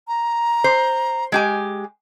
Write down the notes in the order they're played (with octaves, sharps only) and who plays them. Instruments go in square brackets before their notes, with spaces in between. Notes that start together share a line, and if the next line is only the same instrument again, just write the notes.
[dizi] A#5
[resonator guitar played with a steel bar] C5
G#3 G4 G#5